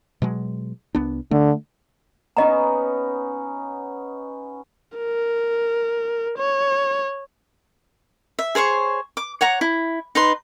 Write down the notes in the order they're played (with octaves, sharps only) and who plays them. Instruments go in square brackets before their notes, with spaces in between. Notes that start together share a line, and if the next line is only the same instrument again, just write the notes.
[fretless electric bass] B2 F#3 G#3
C2 B3 D4
[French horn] D3 [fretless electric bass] A3
[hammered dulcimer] B3 C#4 D#4 [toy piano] D#5 A#5
[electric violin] A#4
C#5
[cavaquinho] E5
G#4 C5 C#5 C#6
D6
C#5 F#5 A#5
E4
D#4 B4 C6